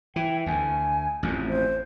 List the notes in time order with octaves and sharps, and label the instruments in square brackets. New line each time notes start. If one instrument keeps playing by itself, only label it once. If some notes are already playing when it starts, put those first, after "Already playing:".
[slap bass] E3 [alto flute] G5
[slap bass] D2 [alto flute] G#5
[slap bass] A1 F2
[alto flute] C5